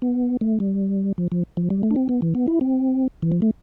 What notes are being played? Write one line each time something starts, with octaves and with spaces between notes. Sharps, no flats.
B3
A3
G3
F3
F3
F3
G3
A3
D4
C4
B3
E3
B3
E4
C4
E3
F3
A3